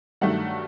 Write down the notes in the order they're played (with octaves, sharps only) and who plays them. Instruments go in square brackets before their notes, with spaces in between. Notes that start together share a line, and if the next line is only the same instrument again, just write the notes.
[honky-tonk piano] G2 D#3 F#3 A3 F#5